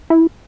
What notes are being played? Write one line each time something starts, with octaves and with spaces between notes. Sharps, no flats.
E4